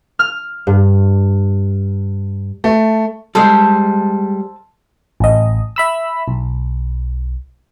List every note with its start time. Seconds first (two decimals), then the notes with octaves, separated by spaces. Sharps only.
0.19 F6
0.67 G2
2.64 A3
3.35 G3 G#3 A4 C5 F5
5.20 A1 D#5
5.76 E5 B5 E6
6.28 B1